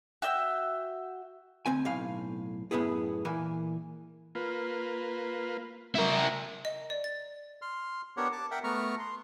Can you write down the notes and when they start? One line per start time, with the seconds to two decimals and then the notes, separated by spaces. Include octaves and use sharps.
0.22 F#4 E5 G5 E6
1.66 D2 C4 G#5
1.85 B1 A2 F5
2.71 F#2 A2 B3 E4 G#4
3.25 A#2 E3 A#3 G#5
4.35 A#3 F4 B4
5.95 F#3 E4 A#4
6.65 D#5
6.90 D5
7.04 A6
7.62 C6 F6
8.17 B3 D4 G4 A#4 C#5 F#5
8.32 A5 D6
8.51 A#4 E5 F#5 G5
8.64 A3 B3 A#5 C#6 F6
8.99 C6